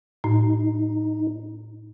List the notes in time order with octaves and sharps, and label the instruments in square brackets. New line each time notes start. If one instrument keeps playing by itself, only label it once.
[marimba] A2 [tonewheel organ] D#4